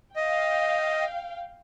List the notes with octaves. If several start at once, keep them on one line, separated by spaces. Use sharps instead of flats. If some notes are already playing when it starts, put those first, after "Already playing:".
D#5 F5 G5